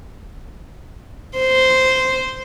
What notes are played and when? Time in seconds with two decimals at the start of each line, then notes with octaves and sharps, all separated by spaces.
1.38 C5